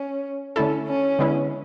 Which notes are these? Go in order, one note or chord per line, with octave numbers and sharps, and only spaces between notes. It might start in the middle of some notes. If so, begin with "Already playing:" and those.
Already playing: C#4
D3 A3 C#4 E4 A4
C#4
D3 G#3 B3 E4